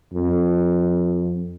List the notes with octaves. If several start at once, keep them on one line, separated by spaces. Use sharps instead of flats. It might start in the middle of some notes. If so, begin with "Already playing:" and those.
F2